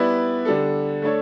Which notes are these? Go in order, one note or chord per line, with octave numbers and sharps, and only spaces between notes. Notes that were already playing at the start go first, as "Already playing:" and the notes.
Already playing: G3 B3 E4 B4 D5
D3 G3 D4 A4
A3 D4 A4 C#5